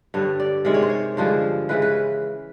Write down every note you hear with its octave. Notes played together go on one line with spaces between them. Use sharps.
G2 D3 G3 C#5
D5
C3 D#3 G#3 D5
C#5
C5
C#5
G2 D3 F3 G#3 C5
C#3 E3 G#3 B4
B4